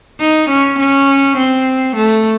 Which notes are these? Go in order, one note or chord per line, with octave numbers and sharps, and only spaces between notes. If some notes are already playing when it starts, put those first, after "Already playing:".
D#4
C#4
C#4
C4
A3